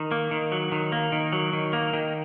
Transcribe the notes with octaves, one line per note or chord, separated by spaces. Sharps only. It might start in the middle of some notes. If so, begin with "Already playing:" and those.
Already playing: D#3
A#3
D#3
F#3
D#3
A#3
D#3
F#3
D#3
A#3
D#3